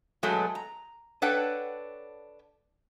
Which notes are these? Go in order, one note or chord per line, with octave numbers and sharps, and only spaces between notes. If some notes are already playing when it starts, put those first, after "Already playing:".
B2 F#3 G#3 A3
A#5
D4 A4 B4 C#5 F#5 G5